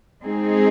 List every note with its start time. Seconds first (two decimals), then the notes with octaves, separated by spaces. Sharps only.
0.23 G#3 C4 D#4 G#4